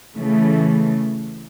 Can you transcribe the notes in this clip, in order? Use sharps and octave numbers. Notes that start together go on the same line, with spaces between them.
C#3 E3 A3